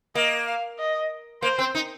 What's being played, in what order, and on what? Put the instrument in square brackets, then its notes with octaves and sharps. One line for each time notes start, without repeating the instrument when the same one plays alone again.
[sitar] A#3 [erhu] D#5
[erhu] F5
D#5
[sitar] A#3 [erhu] C5
[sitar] C4
D#4